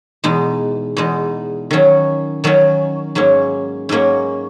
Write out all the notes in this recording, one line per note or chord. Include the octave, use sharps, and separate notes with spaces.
E2 B2 G#3 D#4
E2 B2 G#3 D#4
D#3 F#3 C#4
D#3 F#3 C#4
G#2 F#3 A#3 C#4
G#2 F#3 A#3 C#4